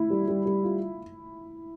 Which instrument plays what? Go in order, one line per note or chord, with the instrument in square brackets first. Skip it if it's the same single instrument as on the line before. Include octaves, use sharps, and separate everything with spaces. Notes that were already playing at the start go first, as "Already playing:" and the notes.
Already playing: [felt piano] E4
[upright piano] G3
G3
G3
F4